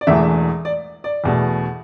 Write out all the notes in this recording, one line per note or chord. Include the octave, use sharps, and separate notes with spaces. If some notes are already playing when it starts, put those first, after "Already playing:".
D5
E1 E2 E3 A3 E5
D5
D5
E2 B2 A3